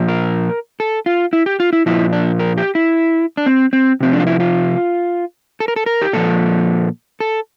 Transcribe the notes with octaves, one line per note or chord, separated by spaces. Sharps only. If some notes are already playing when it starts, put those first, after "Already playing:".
Already playing: A#2 F3
A#4
A4
F4
E4
G4
F4
E4
A#2 F3 E4
D4
A#4
G4
E4
D4
C4
C4
C3 F3 C4
D4
F4
E4
F4
A4
A#4
A4
A#4
G4
A#2 F3 A4
A4